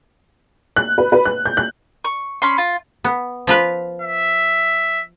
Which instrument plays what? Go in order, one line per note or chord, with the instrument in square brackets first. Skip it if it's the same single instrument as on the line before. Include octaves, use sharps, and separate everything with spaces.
[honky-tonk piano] F#6
B4
B4
F#6
G6
F#6
[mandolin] C#6
C#4 B5 C6
F4
[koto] B3
F3 F4 B4
[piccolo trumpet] E5